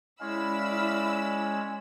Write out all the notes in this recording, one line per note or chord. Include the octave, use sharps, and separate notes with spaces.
G#3 C#4 E4 D5 F5 B5 E6